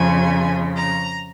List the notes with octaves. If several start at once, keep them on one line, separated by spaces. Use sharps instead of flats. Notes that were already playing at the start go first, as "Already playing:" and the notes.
Already playing: F2 C#3 F3 G#5
A#5